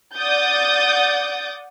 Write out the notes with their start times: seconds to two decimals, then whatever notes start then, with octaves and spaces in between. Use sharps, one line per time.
0.17 D5 F#5 D6 D#6 G6 A6